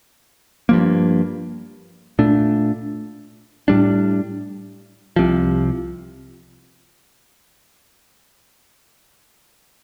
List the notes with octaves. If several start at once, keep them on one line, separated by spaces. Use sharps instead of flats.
G2 F3 A#3
A#2 A3 D4
A2 G3 D4
C2 C3 F3